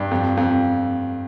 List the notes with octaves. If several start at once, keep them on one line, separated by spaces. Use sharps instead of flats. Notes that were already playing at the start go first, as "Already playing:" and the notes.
Already playing: G2
F2
F2